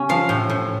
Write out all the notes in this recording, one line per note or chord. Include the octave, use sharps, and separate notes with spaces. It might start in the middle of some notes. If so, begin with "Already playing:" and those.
Already playing: C#3 C#4 G4
F3 F5
A2
A2